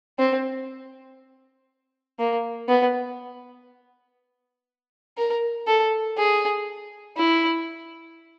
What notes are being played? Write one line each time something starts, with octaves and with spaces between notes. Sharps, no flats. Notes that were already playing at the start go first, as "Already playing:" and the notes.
C4
A#3
B3
A#4
A4
G#4
E4